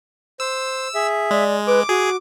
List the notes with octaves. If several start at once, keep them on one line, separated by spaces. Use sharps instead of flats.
C5 E6
G#4 E5
G#3 D5
B4 D6
F#4 G#4